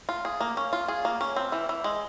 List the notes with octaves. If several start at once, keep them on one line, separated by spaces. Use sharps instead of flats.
F4
G#4
A#3
C#4
F4
G#4
A#3
C#4
C4
E3
E3
G#3